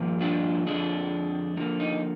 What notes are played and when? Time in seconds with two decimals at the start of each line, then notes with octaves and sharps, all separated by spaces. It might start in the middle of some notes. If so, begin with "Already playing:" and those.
Already playing: G2 F3 A#3
0.21 D4 F4
0.66 F2 D3 G#3 D4
1.57 D3 F3 A#3 D#4
1.80 D#4